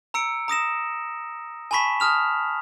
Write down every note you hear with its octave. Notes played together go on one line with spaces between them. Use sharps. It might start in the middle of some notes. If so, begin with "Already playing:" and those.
A#5 E6 C#7 D7
A#5 D#6 A#6 E7
G#5 A5 B5 C#6 B6 E7
A5 D#6 F6 F7